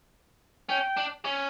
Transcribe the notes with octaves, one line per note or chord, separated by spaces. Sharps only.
C#4 G5
D4
C#4